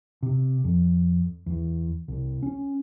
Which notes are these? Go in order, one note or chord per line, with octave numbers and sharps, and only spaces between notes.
C3
F2
E2
C2
C#4